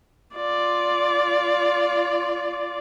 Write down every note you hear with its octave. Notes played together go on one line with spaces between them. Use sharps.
F4 D5